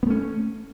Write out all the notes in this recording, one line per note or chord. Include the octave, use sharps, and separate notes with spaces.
A3 B3 C#4